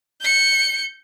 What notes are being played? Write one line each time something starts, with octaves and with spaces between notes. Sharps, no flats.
G6 C#7